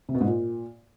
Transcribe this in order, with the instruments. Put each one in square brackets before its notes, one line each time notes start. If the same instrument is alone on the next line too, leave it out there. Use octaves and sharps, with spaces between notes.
[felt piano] C3
B2
G#2
A#2